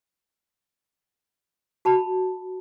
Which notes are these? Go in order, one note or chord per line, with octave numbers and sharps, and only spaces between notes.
F#4 A5 B5